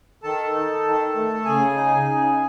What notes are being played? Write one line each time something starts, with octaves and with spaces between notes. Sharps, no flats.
D#3 A4 A5
D#4
D#3
A3
C#3 G#4 G#5
D#4
C#3